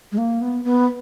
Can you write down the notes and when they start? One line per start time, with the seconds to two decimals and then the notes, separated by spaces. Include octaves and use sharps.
0.12 G#3
0.18 A#3
0.41 B3
0.65 B3